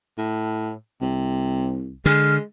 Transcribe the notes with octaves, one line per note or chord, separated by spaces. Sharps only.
A2
C2 C3
D3 G#3 F6